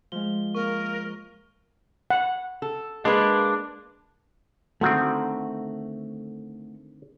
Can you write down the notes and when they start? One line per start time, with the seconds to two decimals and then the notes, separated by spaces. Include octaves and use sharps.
0.12 F3 G#3 G7
0.55 A#3 A#4 C#6
2.10 F#5
2.62 A4
3.05 G#3 A#3 D4 B4
4.81 D3 D#3 A3 C4 F#4